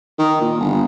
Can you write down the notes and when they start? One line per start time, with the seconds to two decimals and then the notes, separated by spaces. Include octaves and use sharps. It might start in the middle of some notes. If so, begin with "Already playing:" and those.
0.19 D#3
0.41 A#2
0.60 G1